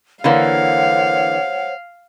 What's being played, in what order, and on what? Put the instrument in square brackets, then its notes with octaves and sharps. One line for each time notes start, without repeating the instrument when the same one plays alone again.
[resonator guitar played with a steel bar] D3 E3 A#3 [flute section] C5 C#5 F#5 [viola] F5